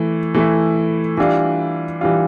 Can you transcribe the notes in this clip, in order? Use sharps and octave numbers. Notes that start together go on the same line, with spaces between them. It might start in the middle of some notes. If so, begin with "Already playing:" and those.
Already playing: E3 A3 E4
E3 A3 E4
E3 G3 D4 F4
E3 G3 D4 F4